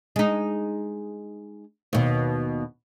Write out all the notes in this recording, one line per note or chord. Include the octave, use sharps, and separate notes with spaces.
G#3 D#4
D#2 B2